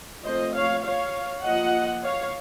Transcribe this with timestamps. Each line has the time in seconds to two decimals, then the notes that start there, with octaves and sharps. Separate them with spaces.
0.24 F3 A3 C4 F4 C5 D#5
0.54 C#5 F5
0.83 C#5 F5
1.44 F3 A#3 F4 D#5 F#5
2.04 C#5 F5